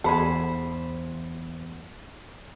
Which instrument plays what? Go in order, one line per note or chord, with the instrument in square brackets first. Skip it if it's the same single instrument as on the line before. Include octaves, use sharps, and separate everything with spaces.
[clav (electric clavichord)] E2 [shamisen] G#4 A4 [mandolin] C5 B5